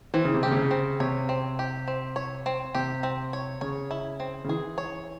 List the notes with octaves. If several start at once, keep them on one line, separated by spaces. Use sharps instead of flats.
E3 C4
C#3
C3
C#3 G4
C3
C#3
C4
C3 C#5
C4
G4
C4
C#5
C4
C3 G4
C4
C#5
C#3 C#5
E4
C4
C#3
E3 G#4
C#5